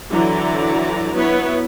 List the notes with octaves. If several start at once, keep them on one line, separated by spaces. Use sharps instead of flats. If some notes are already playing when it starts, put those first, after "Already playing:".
D3 E3 F#3 E4 D5 A#5
F#3 B3 E4 B4 C#5